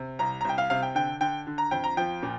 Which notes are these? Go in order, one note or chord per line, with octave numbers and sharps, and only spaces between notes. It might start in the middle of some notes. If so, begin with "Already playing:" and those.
Already playing: C3
C2 A#5
A#5
C2 G5
F5
C3 F5
G5
D3 G5
D3 G5
D3
A#5
F2 G5
A#5
F3 G5
A#2